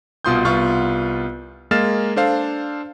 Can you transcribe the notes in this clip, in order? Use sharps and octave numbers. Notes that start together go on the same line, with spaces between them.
C2 B2 F4 C6 D#6 G6
C2 B3 F4 C#6 F6
G#3 A#3 F5 F6 A6 E7
D4 A4 C5 F5